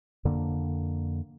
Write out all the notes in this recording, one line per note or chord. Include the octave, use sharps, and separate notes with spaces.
F2 D3 A#3 D4